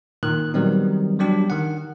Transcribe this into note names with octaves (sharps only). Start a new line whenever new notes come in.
A#2 D#3 F#6
D#3 F#3 G3 B3 C4 D#4
F#3 G3 D4 G4
D#3 F#5